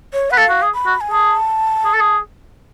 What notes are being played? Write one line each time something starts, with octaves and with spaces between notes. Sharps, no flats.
C#5
B4 F#5
A4 F5
F#4
G#4
B5
F#4
G#5
G#4 A5
G#4
A4
G#4